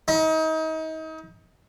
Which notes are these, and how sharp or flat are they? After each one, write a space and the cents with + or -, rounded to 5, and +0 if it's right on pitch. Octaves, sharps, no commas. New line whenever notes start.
D#4 +35